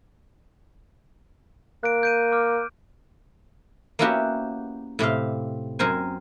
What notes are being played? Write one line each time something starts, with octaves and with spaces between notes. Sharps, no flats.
A#3 F#6 D7
G6 D7 D#7
D6 F6
A#3 B3 C#4 E4 F#4 G4
A2 C3 C4 F5
F#2 C4 A#4 C5 G#5